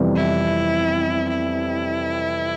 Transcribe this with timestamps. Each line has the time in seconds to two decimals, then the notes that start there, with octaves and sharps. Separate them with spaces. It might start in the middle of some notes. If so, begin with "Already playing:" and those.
Already playing: F2 C3 E3 G3 B3
0.16 E4
1.29 E4